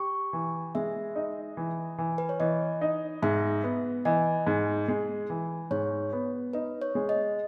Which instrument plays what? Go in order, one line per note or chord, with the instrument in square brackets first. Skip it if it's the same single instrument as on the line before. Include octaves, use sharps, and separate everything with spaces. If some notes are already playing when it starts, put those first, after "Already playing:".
Already playing: [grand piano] G4 [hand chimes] C#6
[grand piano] E3
[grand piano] G#3 [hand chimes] E5
[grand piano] D#4
E3
E3
[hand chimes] B4
C#5
[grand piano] E3 [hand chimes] D#5
[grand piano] D#4
[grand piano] G#2 [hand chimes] E5
[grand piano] B3
[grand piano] E3 [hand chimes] D#5
[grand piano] G#2
G#3
E3
[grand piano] G#2 [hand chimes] C#5
[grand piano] B3
[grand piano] D#4 [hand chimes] B4
[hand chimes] C#5
[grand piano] G#3
[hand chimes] D#5